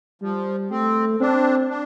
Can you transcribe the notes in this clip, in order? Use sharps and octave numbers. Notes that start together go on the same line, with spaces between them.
F3 G3
A3 C4
C4 D4
D4